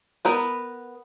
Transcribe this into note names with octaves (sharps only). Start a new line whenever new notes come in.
B3 A#4 B4